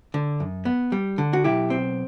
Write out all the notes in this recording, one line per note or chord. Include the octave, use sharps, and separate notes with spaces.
D3
F#2
B3
G3
D3
F#4
B1 E4 G4
C4